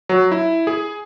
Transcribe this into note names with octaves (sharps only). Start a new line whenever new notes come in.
F#3
E4
G#4